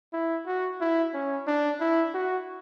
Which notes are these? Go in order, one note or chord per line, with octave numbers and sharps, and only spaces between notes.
E4
F#4
E4
C#4
D4
E4
F#4